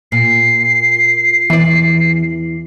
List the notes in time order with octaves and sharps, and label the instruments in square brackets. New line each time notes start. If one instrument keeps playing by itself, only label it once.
[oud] A#2 [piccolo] C7
[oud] E2 D5 [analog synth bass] E3